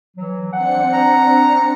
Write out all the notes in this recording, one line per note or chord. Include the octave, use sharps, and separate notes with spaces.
E3 F#3
C4 D4 F#5 C#7
A#5